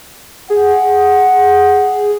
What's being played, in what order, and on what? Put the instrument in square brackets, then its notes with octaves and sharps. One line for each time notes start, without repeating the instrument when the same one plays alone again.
[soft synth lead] G#4 [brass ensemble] F#5